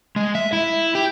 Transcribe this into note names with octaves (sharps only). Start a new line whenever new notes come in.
G#3
E5
E4
G4